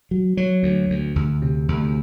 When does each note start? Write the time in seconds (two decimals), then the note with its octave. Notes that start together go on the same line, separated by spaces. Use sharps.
0.11 F#3
0.37 F#3
0.63 D2
0.90 D2
1.16 D2
1.42 C3
1.68 D2